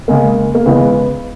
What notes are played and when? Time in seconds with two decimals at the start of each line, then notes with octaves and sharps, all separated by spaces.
0.08 C#3 G#3 A#3
0.55 A#3
0.66 C#3 E3 G#3 B3